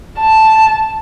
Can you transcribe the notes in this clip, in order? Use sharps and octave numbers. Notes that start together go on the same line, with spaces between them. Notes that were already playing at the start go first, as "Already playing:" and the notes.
A5